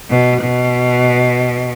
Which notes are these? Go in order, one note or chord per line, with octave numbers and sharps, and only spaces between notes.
B2
B2